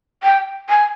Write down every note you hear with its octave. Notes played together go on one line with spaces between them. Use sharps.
G5
G#5